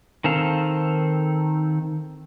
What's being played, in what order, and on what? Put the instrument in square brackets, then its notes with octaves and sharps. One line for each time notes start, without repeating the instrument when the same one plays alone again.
[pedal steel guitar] D#3 C4 A4 F5